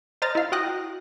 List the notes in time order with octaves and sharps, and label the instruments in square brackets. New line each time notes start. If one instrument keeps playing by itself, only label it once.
[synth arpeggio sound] C5 D#5 A#5 F6 A6
E4 F5
F#4 G5 D#6 F#6 A#6